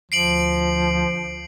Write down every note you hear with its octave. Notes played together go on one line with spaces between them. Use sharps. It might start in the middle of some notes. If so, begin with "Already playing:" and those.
D2 F3 C7 D7 F#7